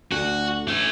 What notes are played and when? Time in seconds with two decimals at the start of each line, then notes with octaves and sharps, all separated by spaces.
0.12 D2 F#4
0.68 A3 C#4